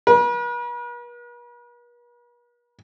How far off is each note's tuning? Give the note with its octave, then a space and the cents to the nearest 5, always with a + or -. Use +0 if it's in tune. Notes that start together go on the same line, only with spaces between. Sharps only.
B4 -45